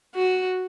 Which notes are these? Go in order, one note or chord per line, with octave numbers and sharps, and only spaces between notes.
F#4